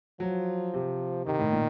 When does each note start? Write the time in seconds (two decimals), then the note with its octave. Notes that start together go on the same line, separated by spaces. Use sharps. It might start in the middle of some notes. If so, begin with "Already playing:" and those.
0.20 F3 F#3
0.74 C3
1.26 C3 D#3
1.39 A2
1.53 A#2